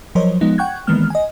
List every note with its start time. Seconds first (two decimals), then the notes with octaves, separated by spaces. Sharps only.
0.15 F3 F#3 A#4 C5 C#5 D#5
0.41 F3 G#3 B3 D#4
0.58 F#5 G5 C#6 F#6 G#6
0.87 D#3 E3 G#3 A#3 B3 F6
1.10 D#5 G#5